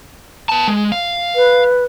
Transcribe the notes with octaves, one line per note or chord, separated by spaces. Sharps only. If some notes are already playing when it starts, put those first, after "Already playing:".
B3 A5
G#3
F5
B4